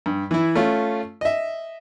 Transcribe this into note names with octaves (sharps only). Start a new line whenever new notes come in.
G2
E3 E4
A3 C#4 F4
D#5 E5